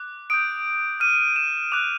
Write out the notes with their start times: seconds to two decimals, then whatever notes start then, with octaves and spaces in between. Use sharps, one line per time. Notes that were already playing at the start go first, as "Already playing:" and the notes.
Already playing: D6 F#6
0.30 D#6 G6 D7
1.00 D6 F6 D#7
1.36 E7
1.72 D6 F#6 F7